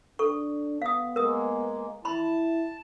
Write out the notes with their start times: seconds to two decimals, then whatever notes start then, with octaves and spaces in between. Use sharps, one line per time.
0.19 D4 A4 C#6
0.82 B3 F5 D#6
1.16 G#3 A#3 A#4 D#6
2.05 E4 A5 B5 C6